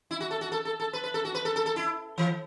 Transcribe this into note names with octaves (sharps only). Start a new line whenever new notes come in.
E4
F#4
A4
F#4
A4
A4
A4
B4
B4
A4
F#4
B4
A4
A4
A4
E4
E3